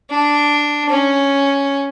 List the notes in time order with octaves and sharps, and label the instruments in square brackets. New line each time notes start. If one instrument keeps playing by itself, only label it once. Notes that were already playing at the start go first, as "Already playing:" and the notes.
[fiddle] D4
C#4